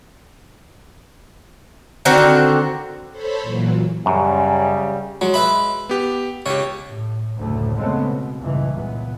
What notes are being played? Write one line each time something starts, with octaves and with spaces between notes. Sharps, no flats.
D3 D#3 C4 F#4
A4 C5 C#5 B5
A#2 E3 F#3
F#2 C#3 G3
F#3 G#3
B4 E5 B5
B3 G4
C#2 G4 C#5
A2
F#1 D2 A2 A3
C#3 G#3 A3 B3 C4
B2
C#2 G2 A#2 E3
C#2 A#2 B3